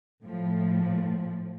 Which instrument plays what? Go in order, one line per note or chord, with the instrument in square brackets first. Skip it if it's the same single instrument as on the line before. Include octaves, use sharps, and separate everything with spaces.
[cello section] A2 F3